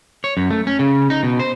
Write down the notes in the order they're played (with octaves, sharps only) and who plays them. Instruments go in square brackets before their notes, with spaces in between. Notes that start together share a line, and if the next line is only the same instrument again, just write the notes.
[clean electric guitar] C#5
F#2
A3
C#4
C#3
D#4
B2
C5